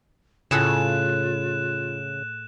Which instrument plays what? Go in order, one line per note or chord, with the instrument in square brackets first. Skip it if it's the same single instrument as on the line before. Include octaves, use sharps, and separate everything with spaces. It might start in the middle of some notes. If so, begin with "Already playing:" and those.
[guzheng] A2 G#4 A4 [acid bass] C#3 [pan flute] F4 [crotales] F#6 E7